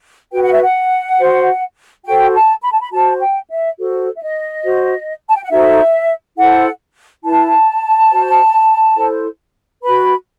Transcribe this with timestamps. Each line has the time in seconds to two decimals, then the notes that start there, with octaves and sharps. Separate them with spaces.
0.32 F#4 B4 G5
0.42 F#5
0.51 E5
0.62 F#5
1.19 F#4 C5
2.05 F#4 A4 C5 G5
2.33 A5
2.62 B5
2.71 A5
2.81 B5
2.91 F#4 C5 A5
3.20 G5
3.49 E5
3.78 F#4 A4 C5
4.16 E5
4.22 D#5
4.64 F#4 C5
5.29 A5
5.36 G5
5.43 F#5
5.50 D#4 F#4 A4 C5 E5
6.37 E4 A4 C5 F#5
7.24 E4 B4 A5
8.11 F#4 C5
8.96 E4 A4 C5
9.82 F#4 B4 B5